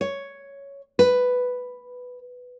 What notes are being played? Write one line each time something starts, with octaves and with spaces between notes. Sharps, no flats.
C#5
B4